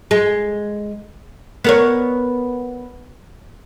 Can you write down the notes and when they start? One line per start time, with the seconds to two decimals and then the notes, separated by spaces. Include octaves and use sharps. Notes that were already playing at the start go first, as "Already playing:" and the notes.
0.11 G#3
1.64 B3 A#4 C#5